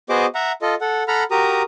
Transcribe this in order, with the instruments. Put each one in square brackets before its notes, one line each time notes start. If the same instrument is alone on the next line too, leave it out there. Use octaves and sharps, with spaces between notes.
[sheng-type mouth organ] B3 F#4 G#4 C5 D#5 D6
E5 F#5 A#5
F4 A4 D#5
A4 F#5
A4 F#5 A#5 B5 F6
F#4 G4 A#4 A#5 D#6